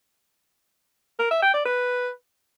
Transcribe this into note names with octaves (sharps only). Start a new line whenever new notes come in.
A#4
E5
G5
D5
B4